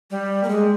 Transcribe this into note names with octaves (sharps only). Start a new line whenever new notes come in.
G3
A#3
G#3